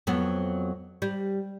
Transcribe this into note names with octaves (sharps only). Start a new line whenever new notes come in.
F2 F#3 B3
G3